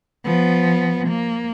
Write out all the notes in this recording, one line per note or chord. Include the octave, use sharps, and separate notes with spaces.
F3 B3
A#3